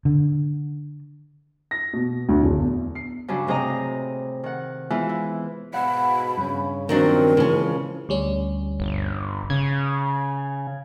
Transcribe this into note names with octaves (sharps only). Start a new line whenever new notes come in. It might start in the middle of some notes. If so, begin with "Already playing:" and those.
D3
A#6
B2
D2
D1
E2
C7
G2 C#3 F#3 C#4 D4
A2 C3 G#4 D#5 A#5
D#3 F#5
E3 G#3 B3 E4 F4 G#4
E4
G#2 B2 F5 F#5 B5
G2 C#3 C#4
D#3 F3 F#3 C4 D4 A#4
A#2 C#3 E3 F3 G#3 C#4
D2 G3 C#4
G1
C#3 G#6